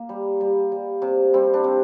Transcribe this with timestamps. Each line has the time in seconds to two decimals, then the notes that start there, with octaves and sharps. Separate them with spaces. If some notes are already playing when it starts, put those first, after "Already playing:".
Already playing: A#3
0.09 G3
0.41 G3
0.72 G3
1.02 C3
1.34 G3 C4
1.54 D4
1.64 C3